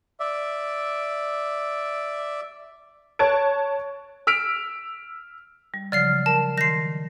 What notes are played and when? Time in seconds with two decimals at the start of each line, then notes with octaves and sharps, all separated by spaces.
0.20 D5 E5
3.19 C#5 A5 F#6 G#6 D7
4.27 E6 F6 B6 D7 F7
5.74 G3
5.92 C#3 F3 F#3 D5 F6 C7
6.26 A#4 A5
6.58 D#3 C6 A#6 C7